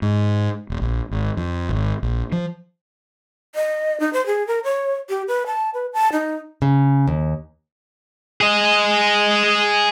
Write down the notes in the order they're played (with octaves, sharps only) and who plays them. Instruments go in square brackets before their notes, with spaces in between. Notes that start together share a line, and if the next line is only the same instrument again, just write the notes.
[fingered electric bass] G#2
E1
A#1
G#1
F2
G#1
A#1
F3
[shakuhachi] D#5
D#4
C5
G#4
A#4
C#5
G4
B4
A5
B4
A5
D#4
[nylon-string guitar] C#3
D#2
[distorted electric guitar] G#4 D#5